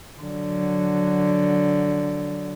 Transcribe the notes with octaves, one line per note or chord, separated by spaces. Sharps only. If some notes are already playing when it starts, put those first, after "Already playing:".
D3 F#3